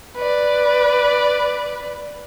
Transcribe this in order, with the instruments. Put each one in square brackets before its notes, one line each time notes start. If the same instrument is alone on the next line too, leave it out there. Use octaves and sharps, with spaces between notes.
[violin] B4 D5